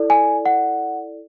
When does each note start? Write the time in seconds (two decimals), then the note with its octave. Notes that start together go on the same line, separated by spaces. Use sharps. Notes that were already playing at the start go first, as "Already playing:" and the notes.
Already playing: E4 A4 D5
0.10 G#5
0.46 F#5